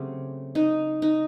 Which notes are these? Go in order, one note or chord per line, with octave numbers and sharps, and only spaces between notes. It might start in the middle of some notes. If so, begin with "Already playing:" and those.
Already playing: C#3 F#3 A3 C4 G4
D#4
D#4